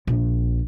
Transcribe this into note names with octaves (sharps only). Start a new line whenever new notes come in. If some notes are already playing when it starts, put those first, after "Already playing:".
A#1